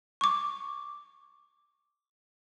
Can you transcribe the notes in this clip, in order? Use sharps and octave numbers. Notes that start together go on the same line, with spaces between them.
C#6 D6